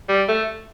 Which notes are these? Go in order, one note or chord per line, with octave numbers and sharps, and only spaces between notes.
G3
A3